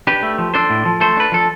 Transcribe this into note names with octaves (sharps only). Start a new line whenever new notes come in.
D4 G4 B4
A3
F3
D4 A4 C5
A2
F3
A3 A4 C5
D4 B4
F3 A4